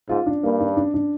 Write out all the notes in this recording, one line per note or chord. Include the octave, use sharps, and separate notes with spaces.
G#2 F4
D4
G2 A#3
D4
D4
D4